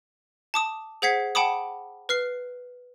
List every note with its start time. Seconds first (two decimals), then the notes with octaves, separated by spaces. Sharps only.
0.54 A5 D6 D#6
1.02 G#4 C5 F#5 G#6 B6 C7
1.35 F#5 G5 A5 B5 D6 D#6
2.09 B4 F6 C7